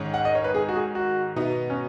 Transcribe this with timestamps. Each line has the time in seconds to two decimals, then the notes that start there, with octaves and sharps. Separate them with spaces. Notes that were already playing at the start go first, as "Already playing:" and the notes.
Already playing: G#2 D#3 G#3 C#4
0.14 F#5
0.25 D#5
0.35 C#5
0.44 B4
0.54 G#4
0.69 F#4
0.76 G#4
0.95 F#4
1.36 B2 B3 D#4
1.70 C#4